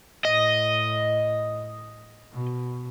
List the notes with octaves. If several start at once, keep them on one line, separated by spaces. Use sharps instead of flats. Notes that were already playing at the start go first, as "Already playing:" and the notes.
A2 D#5
B2